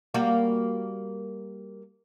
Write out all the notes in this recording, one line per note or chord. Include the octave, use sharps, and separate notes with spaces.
G3 A#3 F#4